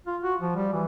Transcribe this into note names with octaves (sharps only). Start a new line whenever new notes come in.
F4
F#4
F3
G3
E3